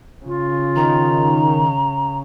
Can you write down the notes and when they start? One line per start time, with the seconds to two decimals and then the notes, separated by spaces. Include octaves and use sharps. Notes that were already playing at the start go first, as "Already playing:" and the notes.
0.25 C#3 F4
0.76 D#3 A#5